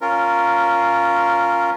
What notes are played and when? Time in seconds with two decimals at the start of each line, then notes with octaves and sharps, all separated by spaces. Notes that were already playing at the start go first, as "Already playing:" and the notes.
0.01 C#4 F4 A#4